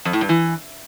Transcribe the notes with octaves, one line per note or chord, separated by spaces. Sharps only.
F2
A2
G2
E3